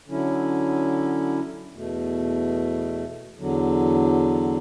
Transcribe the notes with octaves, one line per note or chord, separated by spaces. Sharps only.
D3 F#3 C#4 E4
E2 B2 A3
E2 D3 F#3